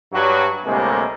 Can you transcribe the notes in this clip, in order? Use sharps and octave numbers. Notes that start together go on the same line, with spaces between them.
G2 F#3 F#4
D2 A2 C3 G3 G#3 A#3